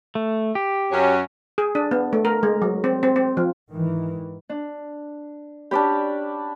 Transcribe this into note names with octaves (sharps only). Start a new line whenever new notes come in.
A3
G4
F#2 C#4
G#4
D4
B3
A3
A#4
G#3
F#3
C4
C4
C4
F3
G#2 D#3 E3
D4
C#4 D4 G4 D5 B5